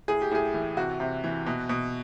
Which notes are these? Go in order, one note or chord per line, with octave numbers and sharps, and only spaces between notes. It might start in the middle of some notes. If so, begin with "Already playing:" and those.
A2 G#4
G4
A2 G#4
E3
C3 F#4
C3
E3
B2
B2